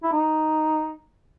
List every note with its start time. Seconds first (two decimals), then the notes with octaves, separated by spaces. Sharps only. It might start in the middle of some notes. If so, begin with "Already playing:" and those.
0.03 E4
0.12 D#4